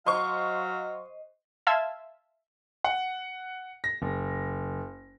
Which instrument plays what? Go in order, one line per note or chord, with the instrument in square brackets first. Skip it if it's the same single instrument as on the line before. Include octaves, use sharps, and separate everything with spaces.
[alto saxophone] F#3 [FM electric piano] C5 D#5 [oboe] F5 [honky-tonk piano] C6 C#6
[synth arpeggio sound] E5 F5 A5 C6 E6 G#6
[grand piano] F#5
A#6
F#1